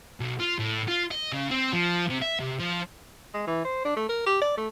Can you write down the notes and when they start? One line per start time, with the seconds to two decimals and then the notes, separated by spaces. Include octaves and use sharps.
0.20 B1
0.40 F4
0.59 A2
0.88 F4
1.11 D#5
1.32 C#3
1.51 C4
1.73 F3
2.09 C3
2.22 E5
2.40 C3
2.60 F3
3.34 G#3
3.47 E3
3.64 C5
3.85 D4
3.96 A3
4.09 A#4
4.26 G4
4.41 D5
4.57 A3